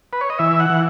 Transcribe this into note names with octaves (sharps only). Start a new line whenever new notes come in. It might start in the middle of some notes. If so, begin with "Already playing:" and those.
B4
C#5
D#5
E3 E5
F#5
E3